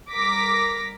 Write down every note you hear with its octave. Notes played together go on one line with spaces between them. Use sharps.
G3 A#4 D6 A#6 B6